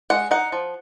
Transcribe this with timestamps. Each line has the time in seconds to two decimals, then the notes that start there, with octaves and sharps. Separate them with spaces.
0.10 G#3 F#5
0.31 D#4 F#5
0.52 F3